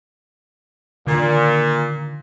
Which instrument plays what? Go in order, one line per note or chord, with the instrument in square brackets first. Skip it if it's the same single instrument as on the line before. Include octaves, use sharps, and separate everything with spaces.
[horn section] A#2 [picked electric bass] D3 D#3